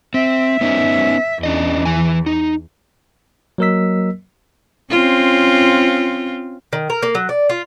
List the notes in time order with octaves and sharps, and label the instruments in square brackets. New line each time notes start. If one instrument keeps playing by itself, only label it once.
[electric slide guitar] C4 [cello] E5
[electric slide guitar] B3 C#4 D#4
[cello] E2 [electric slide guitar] C#4 D4 D#5
[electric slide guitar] E3 G#5
D#4
[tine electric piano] F#3 A#3 A#4 D#5 E6 B6
[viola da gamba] C4 C#4 F4
[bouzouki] D#3
A#4
A#3
F#3
D5
F4